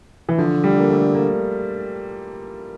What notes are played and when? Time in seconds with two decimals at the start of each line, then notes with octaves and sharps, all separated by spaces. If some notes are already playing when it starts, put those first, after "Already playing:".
0.29 E3
0.38 D3 F3
0.64 G3
0.79 A#3
0.89 A3
1.14 A#3